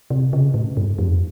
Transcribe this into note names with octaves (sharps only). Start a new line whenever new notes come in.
C3
C#3
A2
G2
F2